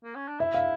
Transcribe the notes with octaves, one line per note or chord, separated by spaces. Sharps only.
A#3
C#4
D4
E4 E5
F5